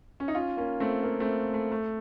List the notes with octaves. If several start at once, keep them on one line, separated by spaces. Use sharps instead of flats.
C#4
D#4
C#4 F4
A#3 C#4
A3 C4
A#3
A3 C4
A3
A3